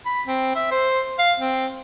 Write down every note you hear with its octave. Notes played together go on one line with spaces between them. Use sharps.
B5
C4
E5
C5
F5
C4